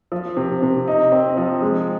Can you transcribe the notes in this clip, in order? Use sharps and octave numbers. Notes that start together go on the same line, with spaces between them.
F3
C3
C3
D#4
C4
F3
G#3